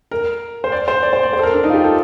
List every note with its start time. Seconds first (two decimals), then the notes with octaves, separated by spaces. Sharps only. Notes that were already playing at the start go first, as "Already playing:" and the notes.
0.11 A#4
0.64 C5
0.72 D5
0.88 C5
1.03 D5
1.13 C5
1.23 D5
1.33 C5
1.39 A4
1.43 A#4
1.54 D4
1.64 D#4
1.70 F4
1.74 G4
1.84 A4